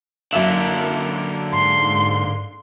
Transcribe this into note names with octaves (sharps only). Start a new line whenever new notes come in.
F#2 D3 A#3 E5
G#2 C6